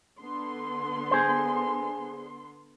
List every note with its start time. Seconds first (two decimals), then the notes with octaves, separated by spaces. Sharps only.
0.20 D3 B3 C6
1.11 G#4 C5